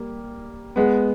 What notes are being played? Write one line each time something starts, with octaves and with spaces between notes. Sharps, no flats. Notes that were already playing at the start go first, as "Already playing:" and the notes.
Already playing: G3 A#3
G#3 B3